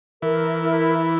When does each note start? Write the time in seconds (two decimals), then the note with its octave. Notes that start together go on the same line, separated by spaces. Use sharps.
0.22 E3 A#4
0.59 E4
0.97 E4